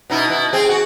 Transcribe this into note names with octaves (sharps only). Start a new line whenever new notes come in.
B2 D#4 E4
B2 E4
C4 G#4
F#4